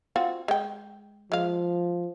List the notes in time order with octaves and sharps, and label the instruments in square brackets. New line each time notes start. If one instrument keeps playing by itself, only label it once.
[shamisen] C4 F4 F#4
G#3 G5
[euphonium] F3 [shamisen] G#3 F5